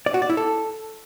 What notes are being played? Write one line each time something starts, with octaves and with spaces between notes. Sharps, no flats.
D5
F#4
D5
E4
A4